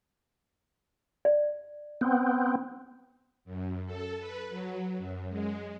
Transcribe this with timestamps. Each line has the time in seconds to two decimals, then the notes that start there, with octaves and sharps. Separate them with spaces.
1.25 D5
2.01 B3 C4
3.45 F#2
3.86 A4
4.19 B4
4.49 F#3
4.98 F#2
5.29 G#3